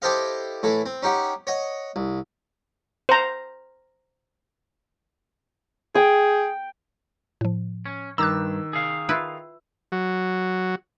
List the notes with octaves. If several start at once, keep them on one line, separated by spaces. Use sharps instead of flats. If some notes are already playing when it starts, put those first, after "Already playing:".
E4 G4 A4 C5 D#5 F5
A2 E3 A4
C4
C#4 D#4 G4 F#5
C#5 D#5 F#5
C2
C5 A#5
G#4 G5
A2 F3
C#4
G2 D#3 A#5 D6 E6 F#6
G#4 F5
E4 F4 B4
F#3